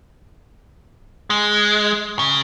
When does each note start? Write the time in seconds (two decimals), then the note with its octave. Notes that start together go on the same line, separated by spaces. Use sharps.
1.30 G#3
2.19 C#3